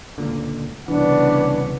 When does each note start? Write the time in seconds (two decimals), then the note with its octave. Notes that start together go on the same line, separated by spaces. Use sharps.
0.18 C#2 A#2 D3
0.88 C2 C#3 E3 B3 D4